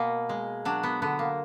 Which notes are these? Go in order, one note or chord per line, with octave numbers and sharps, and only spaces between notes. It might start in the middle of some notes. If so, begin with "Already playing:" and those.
Already playing: B2 A#3
G#3
F#3 D4
B3
D3 B3
A#3